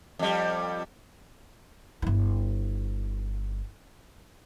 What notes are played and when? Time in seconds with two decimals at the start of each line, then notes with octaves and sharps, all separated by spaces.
0.19 F2 G3
2.02 G1 E4